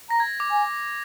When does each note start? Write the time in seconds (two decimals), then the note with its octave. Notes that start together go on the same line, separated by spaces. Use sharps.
0.10 A#5 A#6
0.20 G#6
0.40 D6
0.50 G#5